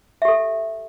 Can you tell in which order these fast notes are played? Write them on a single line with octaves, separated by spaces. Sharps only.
E5 G4 A4